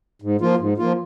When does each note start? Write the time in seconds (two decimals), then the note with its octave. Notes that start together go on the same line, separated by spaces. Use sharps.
0.22 G#2
0.41 F3 A#3 F4
0.59 G#2
0.78 F3 A#3 F4